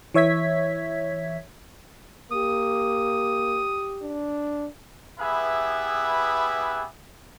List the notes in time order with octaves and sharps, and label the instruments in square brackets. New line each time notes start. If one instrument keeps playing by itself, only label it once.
[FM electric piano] E3 C#5 E5 G#6 B6
[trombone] A#3 [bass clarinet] G4 [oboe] D#6
[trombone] D4
[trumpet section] B3 E4 G4 G#4 B4 E5